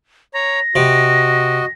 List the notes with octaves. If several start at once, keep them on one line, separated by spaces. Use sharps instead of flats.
C#5 A#5 A#6
C3 F#4 D#5